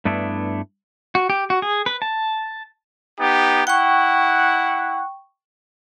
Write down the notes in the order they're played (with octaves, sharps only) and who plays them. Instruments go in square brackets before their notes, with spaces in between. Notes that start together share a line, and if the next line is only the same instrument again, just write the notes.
[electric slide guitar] G2 A3 B3 D4 E4
[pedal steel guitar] F#4
G4
F#4
G#4
B4
A5
[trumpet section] B3 D#4 G4
[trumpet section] E4 F#5 [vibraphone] G5 C#6